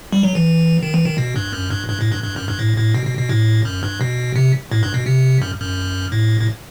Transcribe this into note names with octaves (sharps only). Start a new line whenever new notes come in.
G3
F#3
E3
D#3
E3
D#3
B2
G2
F#2
G2
G2
A2
G2
G2
F#2
G2
A2
A2
B2
B2
B2
A2
F#2
G2
B2
C3
A2
G2
B2
C3
F#2
F#2
A2
A2